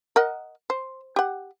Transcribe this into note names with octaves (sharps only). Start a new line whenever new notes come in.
A#4 D#5 F#5
C5
G4 F#5